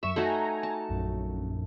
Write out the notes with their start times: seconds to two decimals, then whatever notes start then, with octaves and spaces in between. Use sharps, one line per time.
0.03 F#2 E5 C#6 E7
0.16 A3 D#4 F#4 G#5 A#5
0.63 A5
0.89 A#1 F#2